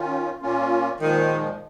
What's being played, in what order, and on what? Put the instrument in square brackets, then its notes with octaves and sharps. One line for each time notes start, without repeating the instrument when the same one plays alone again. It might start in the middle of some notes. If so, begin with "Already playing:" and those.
Already playing: [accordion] D#3 C#4 F4
A#2 A#3 C#4 F4
[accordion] A#2 F3 G#3 [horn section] D#3